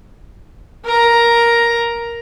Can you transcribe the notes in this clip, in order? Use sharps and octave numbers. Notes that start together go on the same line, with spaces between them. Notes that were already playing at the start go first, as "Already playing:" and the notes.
A#4 A#5